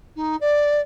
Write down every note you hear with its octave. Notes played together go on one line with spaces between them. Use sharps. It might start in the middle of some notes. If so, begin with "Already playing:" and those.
D#4
D5